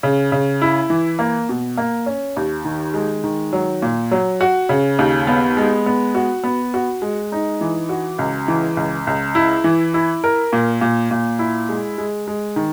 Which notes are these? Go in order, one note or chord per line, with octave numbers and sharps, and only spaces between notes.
C#3
C#3
E4
E3
A#3
B2
A#3
C#4
D#2
D#3
G#3
D#3
F#3
A#2
F#3
F#4
C#3
D#2
B3
G#3
B3
F#4
B3
F#4
G#3
D#4
E3
F#4
C#2
E3
C#2
C#2
E4
E3
E4
A#4
A#2
A#2
A#2
E4
G#3
G#3
G#3
D#3